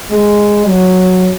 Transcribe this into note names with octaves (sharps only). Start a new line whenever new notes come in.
G#3
F#3